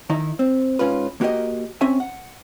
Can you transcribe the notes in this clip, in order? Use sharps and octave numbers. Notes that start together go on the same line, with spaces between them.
D#3 D#4 E4
C4
G#2 C#4 F4 B4
A#3 F#4 G4 A#4 D#5
C4 C#4 E5 G#5
F#5